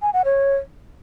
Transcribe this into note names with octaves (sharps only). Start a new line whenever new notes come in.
G#5
F#5
C#5